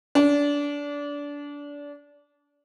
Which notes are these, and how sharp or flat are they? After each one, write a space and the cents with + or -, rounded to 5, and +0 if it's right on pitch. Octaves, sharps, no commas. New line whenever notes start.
D4 -25